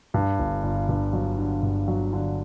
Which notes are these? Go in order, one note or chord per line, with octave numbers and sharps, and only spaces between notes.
G2
G1
G1
G2
F#3
D3
G2
F#3
D3